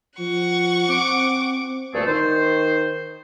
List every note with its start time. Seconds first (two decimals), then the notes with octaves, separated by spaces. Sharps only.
0.19 F3 F#5 C#6
0.89 C4 D6
1.94 D2 G2 A#2 A3 G#4 A4
2.07 D#3 C5